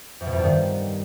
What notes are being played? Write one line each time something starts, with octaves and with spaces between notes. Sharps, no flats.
F2
B2
F2
G2
D#3